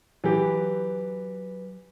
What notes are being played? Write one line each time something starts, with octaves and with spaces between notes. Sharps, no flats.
E3 F#3 G4 B4